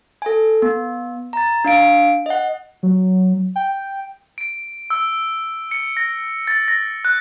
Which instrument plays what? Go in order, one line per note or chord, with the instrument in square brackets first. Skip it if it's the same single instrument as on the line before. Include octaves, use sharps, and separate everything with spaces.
[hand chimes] A4 G#5
B3
A#5 A6
D4 F5 D7
D#5 F#5
[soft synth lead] F#3
G5
[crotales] D7
E6
C#7
A#6
A6
A#6
F#6